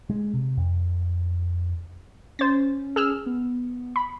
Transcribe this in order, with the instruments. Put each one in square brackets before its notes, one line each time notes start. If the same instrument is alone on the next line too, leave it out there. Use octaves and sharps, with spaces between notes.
[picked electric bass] G#3
C3
F2
[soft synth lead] C#4 [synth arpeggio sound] C5 A6
[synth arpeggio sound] G#4 E6 F6
[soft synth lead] B3
[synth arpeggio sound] B5